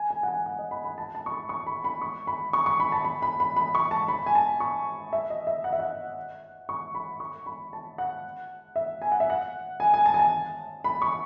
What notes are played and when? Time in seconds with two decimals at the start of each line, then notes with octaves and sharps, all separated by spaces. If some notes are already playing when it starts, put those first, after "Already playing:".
Already playing: G#5
0.10 G#5
0.23 F#5
0.28 G#5
0.46 F#5
0.59 D#5
0.71 B5
0.84 B5
0.98 A5
1.15 A5
1.26 C#6
1.32 B5
1.49 C#6
1.67 B5
1.84 B5
2.01 C#6
2.27 B5
2.53 C#6
2.66 C#6
2.80 B5
2.92 A5
3.05 B5
3.22 B5
3.40 B5
3.56 B5
3.75 C#6
3.91 A5
4.08 B5
4.26 G#5
4.35 A5
4.60 C#6
5.13 E5
5.30 D#5
5.47 E5
5.64 F#5
5.73 E5
5.80 F#5
6.69 C#6
6.95 B5
7.20 C#6
7.46 B5
7.73 A5
7.98 F#5
8.76 E5
9.02 G#5
9.12 F#5
9.20 E5
9.30 F#5
9.80 G#5
9.94 G#5
10.06 A5
10.14 G#5
10.19 A5
10.84 B5
11.02 C#6